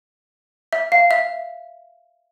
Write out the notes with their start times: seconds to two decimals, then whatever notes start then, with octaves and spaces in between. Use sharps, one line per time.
0.73 E5
0.92 F5
1.11 E5